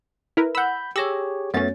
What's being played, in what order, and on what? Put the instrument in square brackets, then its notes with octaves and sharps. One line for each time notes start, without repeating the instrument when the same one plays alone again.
[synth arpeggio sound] E4 A#4 B4
[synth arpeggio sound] F#5 E6 [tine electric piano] B5 G6
[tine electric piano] G4 G#4 C#5 [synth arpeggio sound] E6 A#6
[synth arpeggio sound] F#2 C#4 [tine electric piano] A3 B3 A6